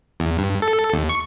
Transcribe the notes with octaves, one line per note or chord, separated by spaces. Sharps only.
E2
G2
A4
D#2
C#6